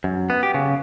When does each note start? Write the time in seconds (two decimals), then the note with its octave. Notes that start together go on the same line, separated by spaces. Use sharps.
0.04 F#2
0.30 B3
0.43 G4
0.54 C#3